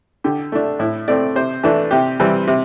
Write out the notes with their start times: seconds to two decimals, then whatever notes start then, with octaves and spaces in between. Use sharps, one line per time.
0.24 D3 G4
0.52 A3 D4
0.79 A2 E4
1.08 A3 C4 D5
1.35 C3 C5
1.63 E3 A3 D4
1.91 C3 G4
2.20 E3 G3 C4
2.47 C3